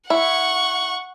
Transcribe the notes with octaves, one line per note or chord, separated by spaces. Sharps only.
E4 F#5 C#6